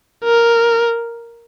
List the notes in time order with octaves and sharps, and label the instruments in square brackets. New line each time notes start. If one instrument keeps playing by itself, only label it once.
[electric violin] A#4